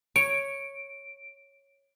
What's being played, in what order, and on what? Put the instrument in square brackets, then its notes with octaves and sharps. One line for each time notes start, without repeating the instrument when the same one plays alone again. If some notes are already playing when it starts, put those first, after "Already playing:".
[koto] C#5 [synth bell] D7